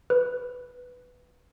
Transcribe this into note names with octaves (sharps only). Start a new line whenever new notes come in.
B4